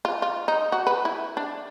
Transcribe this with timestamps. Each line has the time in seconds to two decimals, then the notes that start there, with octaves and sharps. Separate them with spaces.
0.05 F4
0.22 F4
0.48 D#4
0.72 F#4
0.87 B4
1.05 E4
1.37 D4